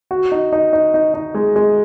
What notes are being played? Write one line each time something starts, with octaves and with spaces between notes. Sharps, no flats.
F#4
D#4
D#4
D#4
D#4
D#4
G#3
G#3